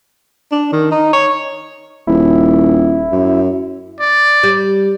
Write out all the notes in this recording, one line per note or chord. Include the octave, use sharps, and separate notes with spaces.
D4
D#3
D#4
C#5
D#1 E4
F#2
D5
G3